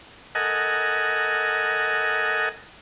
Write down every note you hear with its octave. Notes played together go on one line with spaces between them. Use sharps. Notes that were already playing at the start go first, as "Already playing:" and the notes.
A4 A#4 D#5 F#5 G#5